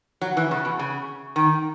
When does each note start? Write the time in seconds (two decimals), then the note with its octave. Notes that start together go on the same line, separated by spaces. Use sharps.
0.21 F#3
0.37 E3
0.51 C#3
0.65 B2
0.79 C#3
1.36 D#3